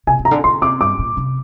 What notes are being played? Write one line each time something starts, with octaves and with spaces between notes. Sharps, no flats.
C3 G#5
C3
A#5
D3
D3 C6
C3 D6
G2 D6
A#2
C3